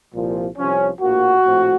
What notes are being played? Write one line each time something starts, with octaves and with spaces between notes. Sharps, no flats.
C2 A#2 F3
C2 C3 F3 C#4
A#1 A2 F3 A#3 F#4
A#1 A2 F3 A3 C4